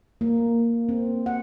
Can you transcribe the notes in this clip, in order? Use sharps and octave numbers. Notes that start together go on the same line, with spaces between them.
A#3
C4
F#5